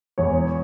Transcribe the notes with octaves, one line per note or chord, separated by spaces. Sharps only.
E1 E2 E3 C#5